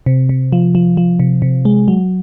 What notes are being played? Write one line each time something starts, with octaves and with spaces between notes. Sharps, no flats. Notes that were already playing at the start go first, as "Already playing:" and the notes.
C3
C3
F3
F3
F3
C3
C3
G#3
F#3